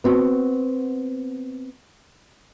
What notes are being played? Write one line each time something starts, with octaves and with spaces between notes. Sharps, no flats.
B3 C4 F#4